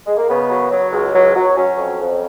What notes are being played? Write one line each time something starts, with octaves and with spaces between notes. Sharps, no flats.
G#3
A#3
C#3 B3
F#3
F#3
C#2
F#3
F#3
F#3 C#4
F2
F2